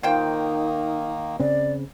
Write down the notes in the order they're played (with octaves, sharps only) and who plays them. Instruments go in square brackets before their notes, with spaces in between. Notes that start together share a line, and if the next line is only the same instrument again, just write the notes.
[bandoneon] D#3 A#3 [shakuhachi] D#4 [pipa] F4 C5 G5
[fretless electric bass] C#3 C4 [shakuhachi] D5